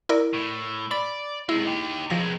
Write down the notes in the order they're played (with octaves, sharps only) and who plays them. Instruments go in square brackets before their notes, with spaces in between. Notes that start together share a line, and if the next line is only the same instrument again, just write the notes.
[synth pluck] E4 A#4 D5
[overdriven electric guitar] A2
[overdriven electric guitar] D5 [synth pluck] B5 A6
[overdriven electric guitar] C3 G#3 [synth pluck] E4
[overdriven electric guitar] D#4 G4
[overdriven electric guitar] C3 G#3 [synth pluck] F3 A#6